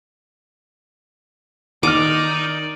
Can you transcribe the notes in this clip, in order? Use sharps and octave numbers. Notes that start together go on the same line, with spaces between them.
D#3 D#4 D5 D6 F6